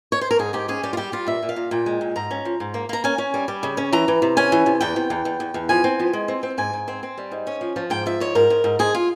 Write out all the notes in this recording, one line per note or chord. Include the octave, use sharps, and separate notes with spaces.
C#5
C5
A#4
G#2 G#4
G#2 G4
C#4 G#4
G3 G4
F4
G3 G4
G3 F4
A#2 E5
A#2
F5
A#2
A#2 G5
G#3
A#2
G#2 A#5
C#4
F3
G#2
A#3
A#3 A#5
C#4 G#5
C#4
G3
G3
C#3
C#4
E3 A#5
E3
C3
C#4 G#5
E3
C3
E2 G5
C3
E2
E2
E2
E2
F3 G#5
C4
F3
G#3
C4
C4
G#2 G#5
G#2
C4
C4
G3
G#2
C#4
F3
F3
G#2 G5
F3 E5
G#2 C#5
G#2 A#4
G#2
G#2
G#2 G#4
F4